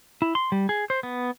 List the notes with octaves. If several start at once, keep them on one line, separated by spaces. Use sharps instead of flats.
E4
C6
G3
G#4
C5
B3